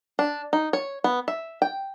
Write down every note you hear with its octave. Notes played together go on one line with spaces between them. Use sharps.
D4
D#4
C#5
B3
E5
G5